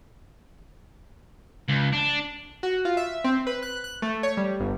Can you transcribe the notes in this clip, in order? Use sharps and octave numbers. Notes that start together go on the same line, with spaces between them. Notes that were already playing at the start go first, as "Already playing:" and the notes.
C#2
D4
F#4
F4
E5
C4
B4
F#6
F#6
A3
C#5
G3
G1